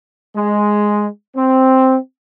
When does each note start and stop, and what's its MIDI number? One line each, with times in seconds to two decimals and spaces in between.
0.36 1.06 56
1.35 1.96 60